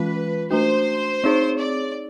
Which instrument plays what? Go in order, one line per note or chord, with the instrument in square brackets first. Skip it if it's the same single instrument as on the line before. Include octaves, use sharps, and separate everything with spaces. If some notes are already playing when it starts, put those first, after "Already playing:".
Already playing: [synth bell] E3 G#3 C#4 F4 [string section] B4
[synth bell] A3 D4 F#4 [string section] C5
[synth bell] C4 D#4 G#4 C#5
[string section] D5